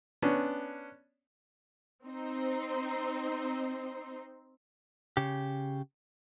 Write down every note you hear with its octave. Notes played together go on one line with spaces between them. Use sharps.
B3 C#4 D4
C4 D#4 C5
C#3 G4